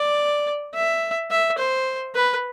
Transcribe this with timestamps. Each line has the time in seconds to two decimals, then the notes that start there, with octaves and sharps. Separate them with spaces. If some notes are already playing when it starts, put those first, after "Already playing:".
Already playing: D5
0.74 E5
1.31 E5
1.59 C5
2.15 B4